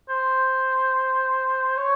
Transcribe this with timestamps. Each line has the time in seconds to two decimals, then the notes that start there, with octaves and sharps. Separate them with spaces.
0.09 C5
1.77 C#5